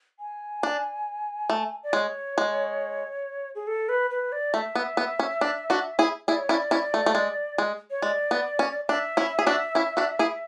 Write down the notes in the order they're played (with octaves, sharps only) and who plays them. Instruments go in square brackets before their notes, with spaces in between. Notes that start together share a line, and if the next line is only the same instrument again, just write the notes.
[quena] G#5
[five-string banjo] D4
A3
[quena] D5
[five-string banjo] G#3 [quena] C#5
[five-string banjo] G#3
[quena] G#4
A4
B4
B4
D5
[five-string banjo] A3 [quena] E5
[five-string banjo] B3
B3
C#4
D4
D4 F#4
E4 G#4
[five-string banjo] E4 G#4 [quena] D5
[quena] C#5
[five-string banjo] C#4 E4 [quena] D5
[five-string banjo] C#4 E4
A3
A3
G#3
G#3
[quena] C#5
[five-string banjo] G#3 [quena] D5
[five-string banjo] B3
C#4
[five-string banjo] D4 [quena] E5
[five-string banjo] C#4 E4
G#4
D4 F#4
C#4 E4
D4 F#4
E4 G#4